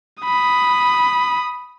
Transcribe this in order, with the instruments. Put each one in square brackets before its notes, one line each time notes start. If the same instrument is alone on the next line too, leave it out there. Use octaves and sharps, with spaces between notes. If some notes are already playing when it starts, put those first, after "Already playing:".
[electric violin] B5 D#6